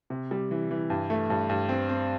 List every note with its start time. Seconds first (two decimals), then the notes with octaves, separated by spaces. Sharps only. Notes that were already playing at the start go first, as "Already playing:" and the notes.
0.10 C3
0.31 G3
0.51 E3
0.71 E3
0.90 G2
1.10 A3
1.30 G2
1.49 G2
1.69 C4
1.89 C4